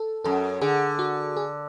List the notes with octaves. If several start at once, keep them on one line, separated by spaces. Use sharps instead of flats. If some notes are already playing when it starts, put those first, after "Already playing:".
Already playing: A4
F#2 A4
D3 G#4
F#4
G#4